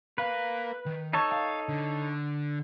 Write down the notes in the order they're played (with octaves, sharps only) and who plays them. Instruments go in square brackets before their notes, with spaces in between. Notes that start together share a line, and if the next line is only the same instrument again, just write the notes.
[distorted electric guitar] A#4 F5 [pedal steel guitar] B4
[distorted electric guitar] D#3
[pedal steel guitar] D#4 A4 C#5 [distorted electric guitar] A5
[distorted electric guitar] F5
D3